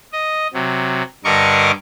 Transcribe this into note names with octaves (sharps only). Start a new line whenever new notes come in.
D#5
C3 F#3
G2 D3 A#4 D#5 C#6 D6